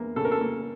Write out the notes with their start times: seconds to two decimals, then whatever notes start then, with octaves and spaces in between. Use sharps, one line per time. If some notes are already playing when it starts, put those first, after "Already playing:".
Already playing: E2 A#3
0.16 C#3 A4
0.25 A#4
0.32 A4
0.41 A#3